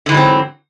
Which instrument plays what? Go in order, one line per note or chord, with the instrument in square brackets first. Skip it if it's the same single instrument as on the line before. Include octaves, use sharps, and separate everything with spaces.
[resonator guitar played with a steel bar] D3
E3
G#2
F#3
C4